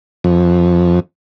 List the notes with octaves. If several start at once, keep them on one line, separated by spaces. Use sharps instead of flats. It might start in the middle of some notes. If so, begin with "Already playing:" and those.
F2